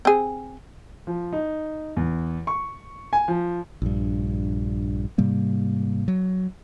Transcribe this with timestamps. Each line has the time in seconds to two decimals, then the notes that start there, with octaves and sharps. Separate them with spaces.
0.05 C4 G#4
1.07 F3
1.33 D#4
1.96 E2
2.47 C#6
3.13 G#5
3.28 F3
3.82 A#1 G2
5.18 G#2 C3 G3 A#3
6.08 F#3